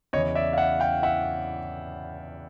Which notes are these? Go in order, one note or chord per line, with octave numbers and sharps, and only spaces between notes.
E2 C#3 E3 C#5 D#5
D5 E5
F5
E5 F#5
F5 G5
E5 F#5